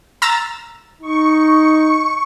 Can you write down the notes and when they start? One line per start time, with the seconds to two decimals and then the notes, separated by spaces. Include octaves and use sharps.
0.22 A#5 E6 A6
1.01 D#4 C#6